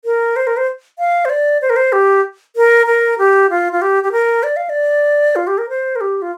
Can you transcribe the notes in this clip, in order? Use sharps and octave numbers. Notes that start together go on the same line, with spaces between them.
A#4
C5
A#4
C5
F5
C5
D5
C5
A#4
C5
G4
A#4
A#4
G4
F4
F4
G4
G4
A#4
D5
F5
D5
F4
G4
A#4
C5
A#4
G4
F4